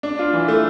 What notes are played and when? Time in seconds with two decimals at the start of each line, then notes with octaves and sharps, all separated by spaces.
0.03 D4
0.19 F4
0.33 E3
0.48 A3